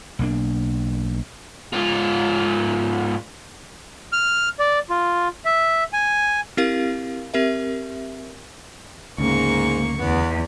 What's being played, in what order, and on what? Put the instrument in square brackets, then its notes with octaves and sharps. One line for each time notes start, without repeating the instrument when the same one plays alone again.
[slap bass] B1 A#3 D4
[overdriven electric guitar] G#2 F4
[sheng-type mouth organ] F6
D5
F4
E5
G#5
[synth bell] C4 E4 G4 A#4 F5
C4 G4 A#4 E5
[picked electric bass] D2 C#3 [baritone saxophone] G#2 [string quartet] A#3 C#6
[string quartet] E2 [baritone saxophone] B3